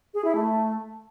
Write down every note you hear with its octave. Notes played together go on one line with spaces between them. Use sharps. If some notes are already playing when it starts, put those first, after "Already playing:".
G#4
E4
A3